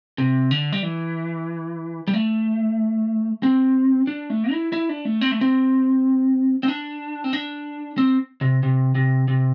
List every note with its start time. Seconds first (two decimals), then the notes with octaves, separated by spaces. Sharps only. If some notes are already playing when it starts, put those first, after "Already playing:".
0.18 C3
0.51 D3
0.72 G3
0.83 E3
2.08 G3
2.13 A3
3.43 C4
4.07 D4
4.30 A3
4.51 E4
4.72 E4
4.89 D4
5.05 A3
5.21 C4
5.31 A3
5.41 C4
6.63 C4
6.68 D4
7.24 C4
7.33 D4
7.98 C4
8.41 C3
8.63 C3
8.95 C3
9.28 C3